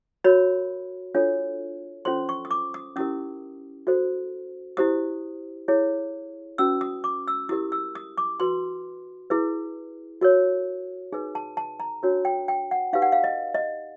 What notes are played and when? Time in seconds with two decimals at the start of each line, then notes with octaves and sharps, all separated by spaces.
0.24 F#4 A#4 C#5 B5
1.15 D4 F4 A4 C#5
2.05 C#4 F4 A4 C5 C6
2.29 C#6
2.45 D#6
2.51 D6
2.74 D#6
2.96 C#4 E4 G4 A#4 D#6
3.87 F#4 A4 C5
4.77 E4 G4 C5 D#6
5.68 E4 G#4 C#5
6.58 C#4 F#4 B4 E6
6.81 D#6
7.04 D6
7.28 E6
7.49 E4 G4 A#4 D#6
7.72 E6
7.95 D#6
8.18 D6
8.40 F#4 B4 C6
9.30 E4 G#4 B4
10.21 F#4 A#4 C#5
11.12 D#4 G#4 B4
11.35 A5
11.57 A5
11.80 A#5
12.03 D4 F#4 A#4 C#5
12.25 G5
12.48 G5
12.71 F#5
12.93 D#4 G4 B4 F5
13.02 F#5
13.12 F5
13.24 D#5
13.54 D#5